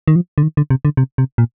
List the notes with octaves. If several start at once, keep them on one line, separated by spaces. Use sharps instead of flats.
D#3
F3
D3
D#3
D3
C3
D3
C3
C3
A#2